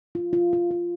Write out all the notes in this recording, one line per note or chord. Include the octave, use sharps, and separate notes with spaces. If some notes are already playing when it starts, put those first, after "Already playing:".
F4
F4
F4
F4